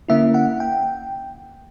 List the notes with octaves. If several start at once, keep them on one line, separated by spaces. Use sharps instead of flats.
D3 A#3 C#4 E4 E5
F#5
G5